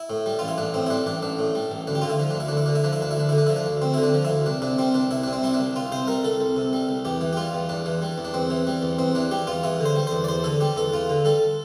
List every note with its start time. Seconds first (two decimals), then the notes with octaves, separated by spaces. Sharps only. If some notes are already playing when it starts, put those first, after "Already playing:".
Already playing: E4
0.10 A2
0.26 G3
0.39 A1 F4
0.48 E4
0.58 A1 D4
0.74 A2 C4
0.86 E4
0.90 G3 D4
1.06 A1 D4
1.22 A1 D4
1.39 A2
1.55 G3
1.71 A1
1.87 D2 D4
1.95 G4
2.01 D3 F4
2.09 E4
2.20 F3
2.31 D4
2.35 D2 E4
2.48 D2 D4
2.57 E4
2.66 D3 D4
2.75 E4
2.84 F3 D4
2.93 E4
3.01 D2 D4
3.11 E4
3.17 D2 D4
3.29 D3 E4
3.38 D4
3.47 F3 E4
3.56 D4
3.66 D2
3.82 D2 C4
3.94 D3 E4
4.03 D4
4.14 F3
4.25 D2 E4
4.46 C2 D4
4.62 C3 D4
4.79 G3 C4
4.94 C2 D4
5.11 C2 E4
5.23 C3 D4
5.33 C4
5.43 G3 E4
5.54 D4
5.59 C2
5.76 C2 F4
5.92 C3 C5
6.08 G3 A#4
6.24 C2 A4
6.40 C2
6.56 C3
6.73 G3
6.89 C2
7.05 E2 G4
7.21 E3
7.33 G4
7.37 G3 F4
7.53 E2
7.69 E2 D4
7.86 E3
8.02 G3
8.18 E2
8.25 D4
8.34 E2 C4
8.50 E3
8.67 G3
8.83 E2
8.99 E2 C4
9.15 E3 D4
9.31 G3 G4
9.47 E2 F4
9.63 E2 E4
9.80 D3
9.85 C5
9.96 G3
10.07 E2 C5
10.24 D5
10.28 E2 C5
10.44 D3 A4
10.61 G3 G4
10.76 E2 A4
10.92 E2 F4
11.09 D3
11.25 G3 A4